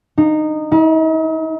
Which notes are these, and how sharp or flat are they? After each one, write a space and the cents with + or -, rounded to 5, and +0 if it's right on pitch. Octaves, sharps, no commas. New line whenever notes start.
D#4 -15
D#4 +45